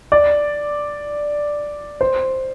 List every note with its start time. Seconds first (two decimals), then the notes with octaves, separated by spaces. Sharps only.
0.12 D5
2.01 C5